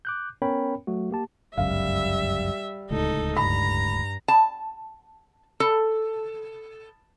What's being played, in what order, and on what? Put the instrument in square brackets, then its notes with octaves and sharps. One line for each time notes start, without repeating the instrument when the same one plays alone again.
[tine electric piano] D6 F#6 G6
B3 C#4 A#4 C#5 G5 B5
F#3 A3 F#4
A#3 G4 A5
[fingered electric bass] G1 C#2 F#2 [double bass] G3 [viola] E5 [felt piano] F5
[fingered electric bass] D1 C#2 A2 [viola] D#4 A4
[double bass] G2 [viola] A#5 [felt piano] B5
[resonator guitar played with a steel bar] A5
A4